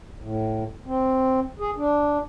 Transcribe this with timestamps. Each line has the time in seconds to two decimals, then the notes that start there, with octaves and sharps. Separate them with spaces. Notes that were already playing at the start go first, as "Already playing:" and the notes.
0.19 A2
0.87 C4
1.59 G#4
1.76 D4